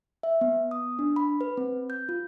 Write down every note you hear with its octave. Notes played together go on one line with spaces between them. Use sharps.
E5
B3
D#6
D4
B5
B4
C4
G6
F4